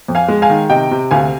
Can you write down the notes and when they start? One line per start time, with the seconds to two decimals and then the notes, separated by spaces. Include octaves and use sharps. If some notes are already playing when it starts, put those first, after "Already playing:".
0.08 F2
0.15 F5 G#5
0.28 G#3
0.42 F5 G#5
0.50 D#3
0.69 C3 D#5 G5
0.91 C3
1.11 D2 F5 G#5